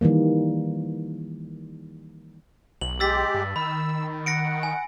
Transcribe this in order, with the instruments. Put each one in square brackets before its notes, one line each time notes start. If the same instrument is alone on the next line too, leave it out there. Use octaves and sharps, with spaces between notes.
[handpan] D#3 E3 G3 A#3
[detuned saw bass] B1 [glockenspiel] F#7
[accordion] G#3 G4 [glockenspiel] E6 A6 B6
[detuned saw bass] G2
[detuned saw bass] D#3 [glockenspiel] B5 [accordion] E6
[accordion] F#5 [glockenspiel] A#6 C#7 D7
[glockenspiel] G#5